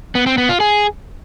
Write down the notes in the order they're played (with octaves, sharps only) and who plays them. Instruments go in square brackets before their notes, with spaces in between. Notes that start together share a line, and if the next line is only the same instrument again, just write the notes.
[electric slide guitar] B3
C4
B3
F4
G#4